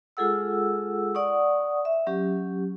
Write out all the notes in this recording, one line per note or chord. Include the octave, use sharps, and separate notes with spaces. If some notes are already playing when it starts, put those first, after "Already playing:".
G#3 F4 G#4 A4 F#5 E6
D5 F#5 C#6 D#6
E5
F#3 C#4 G4